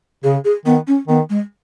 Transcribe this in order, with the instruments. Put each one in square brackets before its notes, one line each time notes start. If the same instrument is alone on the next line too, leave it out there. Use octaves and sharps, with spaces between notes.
[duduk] C#3 [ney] G#4
[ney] G#4
[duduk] D#3 [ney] B3
[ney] C#4
[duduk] D#3 [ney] B3
[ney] G#3